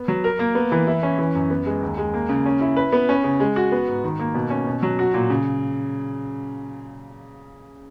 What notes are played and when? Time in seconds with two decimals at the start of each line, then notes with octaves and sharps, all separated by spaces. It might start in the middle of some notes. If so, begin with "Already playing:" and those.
Already playing: B3
0.08 F#3
0.24 A#4
0.39 A#3
0.55 B3
0.72 E3
0.87 E4
1.03 C#4
1.18 E3
1.35 F#2
1.50 B3
1.66 G#3
1.82 D#2
1.98 G#3
2.14 A#3
2.29 C#3
2.45 C#4
2.61 E4
2.76 B4
2.93 B3
3.09 C#4
3.24 C#3
3.40 G#3
3.56 F#4
3.72 B3
3.88 G#2
4.04 D#3
4.19 A#3
4.35 B2
4.50 C#4
4.67 B2
4.83 F#3
4.99 F#4
5.14 A#2
5.30 C#3